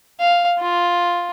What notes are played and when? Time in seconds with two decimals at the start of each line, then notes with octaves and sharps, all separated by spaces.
0.20 F5
0.59 F4